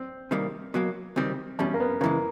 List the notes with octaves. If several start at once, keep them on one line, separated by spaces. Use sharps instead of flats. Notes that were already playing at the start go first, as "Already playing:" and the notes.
Already playing: C4
C3 D#3 G3 A#3
B2 F#3 A#3
C#2 C3 D#3 G3 C4
E2 B2 G3 C#4
A#3
B3
C#3 E3 G#3 A#3